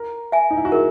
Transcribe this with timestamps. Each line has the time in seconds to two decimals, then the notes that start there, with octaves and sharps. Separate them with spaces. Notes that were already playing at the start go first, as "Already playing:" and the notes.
Already playing: A#4
0.32 E5 G#5
0.51 D#4
0.57 E4
0.65 F#4
0.72 G#4 A#4